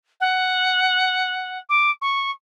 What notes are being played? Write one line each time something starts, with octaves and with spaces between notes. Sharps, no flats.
F#5
D6
C#6